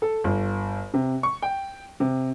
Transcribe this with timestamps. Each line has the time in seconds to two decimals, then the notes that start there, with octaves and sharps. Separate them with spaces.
0.02 A4
0.24 G1
0.94 C3
1.23 C#6
1.42 G5
2.00 C3